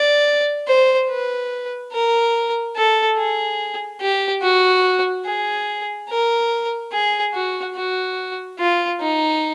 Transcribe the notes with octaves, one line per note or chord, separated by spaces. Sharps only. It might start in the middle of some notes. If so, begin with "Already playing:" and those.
Already playing: D5
C5
B4
A#4
A4
G#4
G4
F#4
G#4
A#4
G#4
F#4
F#4
F4
D#4